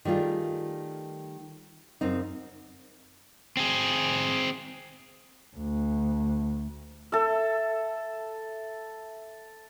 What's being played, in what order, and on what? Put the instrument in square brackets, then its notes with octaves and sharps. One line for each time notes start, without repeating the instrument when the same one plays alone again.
[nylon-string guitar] D#3 G3 A3 F4 G#4
F#2 C#3 C4 D#4
[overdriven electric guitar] C4 G#4
[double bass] D2
[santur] A4 E5